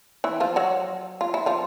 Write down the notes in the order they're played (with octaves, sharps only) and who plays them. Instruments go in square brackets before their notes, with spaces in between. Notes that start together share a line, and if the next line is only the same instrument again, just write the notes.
[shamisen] E3 E4
F3 F4
F#3 F#4
F4
E4
F3 F4